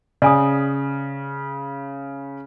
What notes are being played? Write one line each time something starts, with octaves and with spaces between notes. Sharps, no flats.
C#3 D5 G#5 D#6